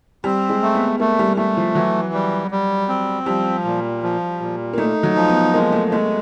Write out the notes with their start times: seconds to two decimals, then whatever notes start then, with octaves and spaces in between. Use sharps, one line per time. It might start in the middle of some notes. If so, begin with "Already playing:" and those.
0.24 G3 C4
0.49 G#3
0.62 A3
0.75 B3
1.00 A3 A#3
1.19 G3
1.37 G3 A3
1.57 F3
1.75 E3 F#3
2.13 G3
2.51 G3
2.89 C4
3.26 F3 G3
3.65 A#2
4.03 F3
4.40 A#2
4.73 A#3
4.78 A3 D#4
5.03 F#3
5.16 F3
5.28 B3
5.54 G#3 A#3
5.72 A3
5.91 G#3 A3